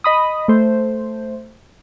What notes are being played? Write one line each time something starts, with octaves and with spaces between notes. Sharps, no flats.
D#5 B5 D#6
A3 C5